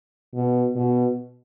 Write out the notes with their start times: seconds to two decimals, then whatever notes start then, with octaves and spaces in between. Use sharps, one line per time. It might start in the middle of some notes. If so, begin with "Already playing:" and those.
0.34 B2
0.75 B2